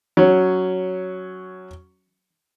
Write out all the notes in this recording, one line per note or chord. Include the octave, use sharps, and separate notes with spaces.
F#3 C#4